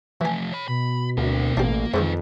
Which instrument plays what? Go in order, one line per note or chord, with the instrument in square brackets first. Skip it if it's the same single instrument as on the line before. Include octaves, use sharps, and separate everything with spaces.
[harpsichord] E3 G#5 [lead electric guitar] F3 A3
[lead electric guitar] C#5 B5
[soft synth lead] B2 [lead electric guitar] B5
[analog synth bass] D2 [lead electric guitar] C4 A#4
[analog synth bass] A1 [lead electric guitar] A#3 A#4 [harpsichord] D4 G4
[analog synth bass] F2 [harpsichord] G#2 D3 D#3 [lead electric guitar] D#4 B4